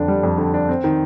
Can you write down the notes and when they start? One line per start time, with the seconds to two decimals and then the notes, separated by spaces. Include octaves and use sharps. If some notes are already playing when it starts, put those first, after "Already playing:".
Already playing: F2 D3 D4
0.08 G3
0.23 F2
0.38 D3
0.54 D4
0.69 C4
0.84 D#3